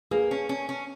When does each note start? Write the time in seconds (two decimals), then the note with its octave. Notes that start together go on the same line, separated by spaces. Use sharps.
0.11 A#3 G#4 B4
0.31 C#4
0.49 C#4
0.69 C#4